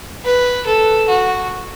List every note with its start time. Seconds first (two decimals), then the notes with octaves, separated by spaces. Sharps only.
0.25 B4
0.67 A4
1.08 F#4